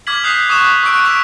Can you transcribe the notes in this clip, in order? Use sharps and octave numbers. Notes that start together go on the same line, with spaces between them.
D6 F6 G#6 B6 F#7
D6 D#6 F#6 G6 B6 C7
C#6 D#6 F#6 E7
C#6 E6 F#6 D7
C#6 D6 E6 B6 D7 F7